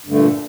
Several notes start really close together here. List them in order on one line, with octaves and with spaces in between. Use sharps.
G2 D3 A3 A#2